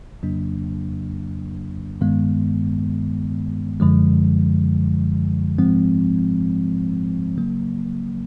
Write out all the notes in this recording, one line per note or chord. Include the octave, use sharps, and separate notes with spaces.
F2 C#3 F#3 A#3 D4
G2 D#3 G#3 B3
F#2 D3 F3 G#3
G#2 F3 G#3 C4
C#3 F#3 A#3